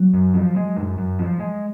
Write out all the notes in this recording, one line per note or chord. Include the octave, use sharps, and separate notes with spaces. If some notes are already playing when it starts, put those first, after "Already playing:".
Already playing: F#3
F#2
F3
G#3
F#2
F#2
F3
G#3